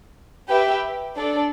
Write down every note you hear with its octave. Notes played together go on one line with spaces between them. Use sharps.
G4 B4 E5 G5
D4 A4 D5